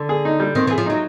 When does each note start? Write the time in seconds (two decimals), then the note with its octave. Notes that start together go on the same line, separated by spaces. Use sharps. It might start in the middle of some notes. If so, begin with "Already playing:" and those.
Already playing: D3
0.09 G#4
0.25 D#4
0.40 G3
0.55 D#3 C4
0.67 E3 G#4
0.78 F3
0.86 F#3 D#4